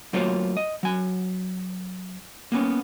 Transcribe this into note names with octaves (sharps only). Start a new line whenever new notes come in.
F#3 A3 A#3 F4 C5 C#5
D#5
F#3 G#5
A#3 B3 C#4